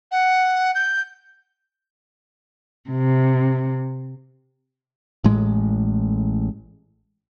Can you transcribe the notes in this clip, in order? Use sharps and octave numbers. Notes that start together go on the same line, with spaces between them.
F#5
G6
C3
A1 A2 G#3